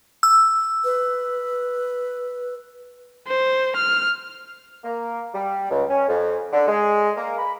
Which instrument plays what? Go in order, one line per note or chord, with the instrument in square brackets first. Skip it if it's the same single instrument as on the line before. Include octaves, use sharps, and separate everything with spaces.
[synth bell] E6
[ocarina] B4
[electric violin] C5
F6
[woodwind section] A#3
G3
C#2
C#4
F2
D3
G#3
A#3
B5